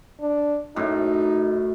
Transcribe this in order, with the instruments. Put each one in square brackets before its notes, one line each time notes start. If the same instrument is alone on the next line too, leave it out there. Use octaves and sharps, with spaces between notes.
[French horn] D4
[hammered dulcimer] F#2 A2 [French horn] D#4